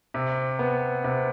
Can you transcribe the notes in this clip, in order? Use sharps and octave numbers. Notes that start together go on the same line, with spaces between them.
C3
B3
C3